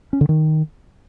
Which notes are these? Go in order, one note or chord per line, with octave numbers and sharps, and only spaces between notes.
C#4
D3
D#3